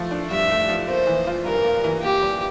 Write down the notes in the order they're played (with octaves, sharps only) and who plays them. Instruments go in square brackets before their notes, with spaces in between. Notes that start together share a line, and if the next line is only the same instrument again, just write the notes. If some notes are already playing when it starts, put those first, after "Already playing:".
Already playing: [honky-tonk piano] F3 A3
D4
[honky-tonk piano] G2 [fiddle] E5
[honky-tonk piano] A3
F3
[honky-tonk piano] A#3 [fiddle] C5
[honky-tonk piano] E3
F4
[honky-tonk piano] G2 [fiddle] A#4
[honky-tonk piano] A#3
E3
[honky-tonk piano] A#3 [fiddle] G4
[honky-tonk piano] G3